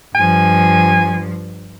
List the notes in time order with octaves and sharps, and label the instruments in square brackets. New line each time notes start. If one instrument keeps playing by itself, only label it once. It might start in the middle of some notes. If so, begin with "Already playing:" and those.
[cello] G2 F3 [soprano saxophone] G#5